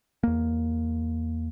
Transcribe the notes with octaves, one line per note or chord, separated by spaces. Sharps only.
E2 A#3